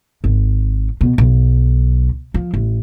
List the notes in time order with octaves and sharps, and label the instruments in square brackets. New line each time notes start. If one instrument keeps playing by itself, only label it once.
[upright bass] G#1
B2
B1
F3
A1